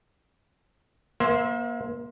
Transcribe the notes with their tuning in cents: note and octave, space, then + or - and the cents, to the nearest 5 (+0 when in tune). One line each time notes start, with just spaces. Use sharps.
A#3 +35 C5 +0 E5 +0